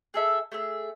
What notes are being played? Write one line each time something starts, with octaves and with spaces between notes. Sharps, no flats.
G#4 A4 E5
A3 G#4 E5